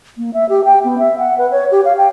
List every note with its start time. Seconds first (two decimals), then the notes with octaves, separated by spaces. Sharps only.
0.17 A#3
0.34 E5
0.49 G4
0.65 G5
0.84 B3
0.98 E5
1.18 F#5
1.38 B4
1.51 C#5
1.71 G4
1.85 F5
1.97 G5